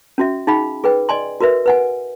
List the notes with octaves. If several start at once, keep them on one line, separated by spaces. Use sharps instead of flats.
C#4 F#4 E5
D#4 G#4 F5 G5 B5
G#4 B4 G5
D5 D#5 G#5 C6
F#4 A#4 B4 E5
B4 F#5 G#5